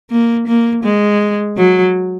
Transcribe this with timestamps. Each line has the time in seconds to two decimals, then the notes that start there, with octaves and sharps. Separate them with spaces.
0.11 A#3
0.48 A#3
0.84 G#3
1.57 F#3